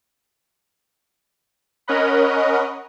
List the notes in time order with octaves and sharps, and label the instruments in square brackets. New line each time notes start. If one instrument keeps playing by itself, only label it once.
[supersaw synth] C#4 A#4 C#5 D#5 F#5 B5